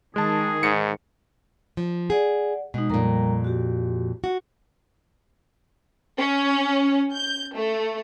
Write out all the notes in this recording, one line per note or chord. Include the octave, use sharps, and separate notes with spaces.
D#3 G#3 G#4 A5
G#2 C#7
F3
G#4 D5 F#5
B2 G#3 D#4
F2 A#2 G3 A#4 A#5
F#4 G4
F#4
C#4
G6
A3